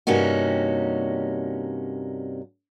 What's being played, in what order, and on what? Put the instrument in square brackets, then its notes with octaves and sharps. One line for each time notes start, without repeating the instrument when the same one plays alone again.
[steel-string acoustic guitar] G2 C3 A#3 C#4 D#4 F#4